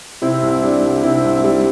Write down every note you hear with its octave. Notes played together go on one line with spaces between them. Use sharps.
C3 C4 E4
C2
G3 D4
C2
C3 C4 E4
C2
G3